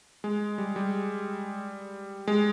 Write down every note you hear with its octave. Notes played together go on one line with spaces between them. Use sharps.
G#3
G3
G3
G#3